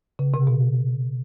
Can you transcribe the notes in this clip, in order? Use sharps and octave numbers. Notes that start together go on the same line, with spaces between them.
C#3
C3
B2